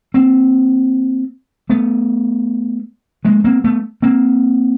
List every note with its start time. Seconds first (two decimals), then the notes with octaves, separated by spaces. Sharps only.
0.14 A#3 C4
1.70 A3 B3
3.25 G#3 A#3
3.44 A#3 C4
3.64 A3 B3
4.02 A#3 C4